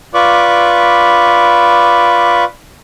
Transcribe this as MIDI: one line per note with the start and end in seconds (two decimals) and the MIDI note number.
0.14 2.44 65
0.14 2.44 71
0.14 2.44 74
0.14 2.44 83
0.14 2.44 85
0.14 2.44 86